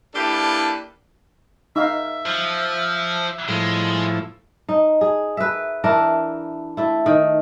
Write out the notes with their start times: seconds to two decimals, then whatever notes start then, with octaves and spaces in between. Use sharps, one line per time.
0.15 A#3 D4 E4 G4 A4 B4
1.76 D#4 E5 F5
2.26 F3
3.49 A2 F3 G#3 E4
4.69 D#4
5.01 G#4
5.37 B4 E5
5.84 E3 D4 E4 A#4
6.77 A3 E4
7.06 D#3